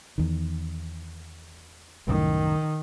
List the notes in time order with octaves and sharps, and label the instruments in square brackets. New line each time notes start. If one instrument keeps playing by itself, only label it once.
[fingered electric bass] E2 D#3
[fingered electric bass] C2 F#2 A2 [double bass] D#3